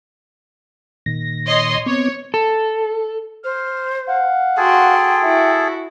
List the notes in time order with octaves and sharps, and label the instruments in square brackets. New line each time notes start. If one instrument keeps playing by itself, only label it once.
[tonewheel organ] A#2 D#3 A#6
[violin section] C#5 D#5 C6
[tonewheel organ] B3 C4 D6 [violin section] C#5
[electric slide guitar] A4
[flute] C5 [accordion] F6
[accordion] F5 F#5
[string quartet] F#4 C6 [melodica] G#4 A4 [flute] G5
[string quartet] E4 F#4 [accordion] E5